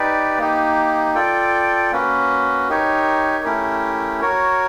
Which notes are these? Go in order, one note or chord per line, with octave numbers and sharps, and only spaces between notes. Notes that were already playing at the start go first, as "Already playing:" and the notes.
Already playing: D#4 G4 B4 D5
A#3 D#4 G4
F4 A4 D5 G5
A#3 C#4 F#4 B4
D#4 G4 A#4 C#5
A3 C#4 E4 G4 A#4
F#4 A#4 C#5